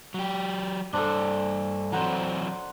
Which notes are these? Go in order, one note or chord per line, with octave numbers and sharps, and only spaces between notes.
F#3 G4
G2 D4 A4 C5
E3 F#3 C4 C5 F#5 A#5